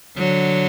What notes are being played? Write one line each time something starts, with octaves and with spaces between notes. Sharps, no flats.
D3 F#3